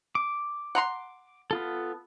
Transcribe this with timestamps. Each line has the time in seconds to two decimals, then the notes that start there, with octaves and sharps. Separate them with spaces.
0.15 D6
0.75 F#5 A#5 C6
1.51 B3 F4 A4